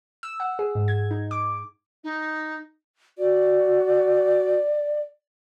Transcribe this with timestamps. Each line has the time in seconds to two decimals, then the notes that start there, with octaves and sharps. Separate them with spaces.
0.23 E6
0.40 F#5
0.59 G#4
0.75 G#2
0.88 G#6
1.11 D#4
1.31 D6
2.04 D#4
3.18 F#4 D5